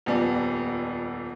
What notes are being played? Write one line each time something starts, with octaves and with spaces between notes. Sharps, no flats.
D#1 F2 B3 D5